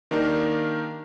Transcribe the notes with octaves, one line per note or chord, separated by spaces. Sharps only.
D#3 A#3 D4 D#4 G4 A#4